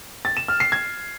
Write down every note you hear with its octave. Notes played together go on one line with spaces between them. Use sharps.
A6
E7
F6
C7
G#6